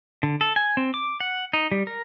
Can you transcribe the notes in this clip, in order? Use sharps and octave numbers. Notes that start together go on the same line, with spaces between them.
D3
A4
G#5
C4
D6
F#5
D#4
G3
A#4